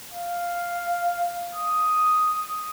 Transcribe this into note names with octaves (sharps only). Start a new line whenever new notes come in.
F5
D#6